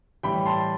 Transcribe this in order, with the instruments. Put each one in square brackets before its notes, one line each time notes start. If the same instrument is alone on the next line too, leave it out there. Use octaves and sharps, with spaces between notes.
[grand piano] A2 E3 G3 G5 B5
A5 C6